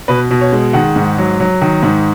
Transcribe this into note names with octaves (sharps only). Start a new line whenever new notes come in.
B2 B4
B2
C#5
G#3
D#3 F#5
G#2
F#3
F#3
D#3
G#2